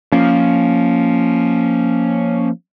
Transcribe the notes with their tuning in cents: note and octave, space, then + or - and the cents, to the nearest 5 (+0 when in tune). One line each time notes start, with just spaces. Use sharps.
F3 +0 A#3 +0 C#4 +0